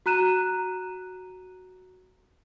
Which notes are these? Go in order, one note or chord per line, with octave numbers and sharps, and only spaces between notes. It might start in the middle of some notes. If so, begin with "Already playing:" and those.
F#4 A#5 F#6 D#7 E7